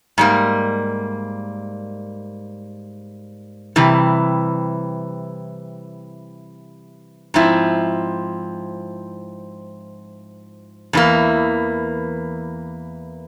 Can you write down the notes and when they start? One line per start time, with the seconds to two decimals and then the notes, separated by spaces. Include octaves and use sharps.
0.18 G#2 G3 A#3
3.76 C3 E3 G3
7.34 G#2 F3 C4 E4
10.93 E2 E3 A#3